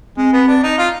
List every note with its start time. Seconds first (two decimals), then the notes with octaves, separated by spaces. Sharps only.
0.17 G#3 C4
0.33 B3
0.48 D4
0.63 D#4
0.78 F4